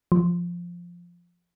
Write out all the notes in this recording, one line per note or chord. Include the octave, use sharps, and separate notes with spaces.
F3